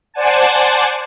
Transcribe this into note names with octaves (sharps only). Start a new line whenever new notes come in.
C5 D5 F#5 G#5 A5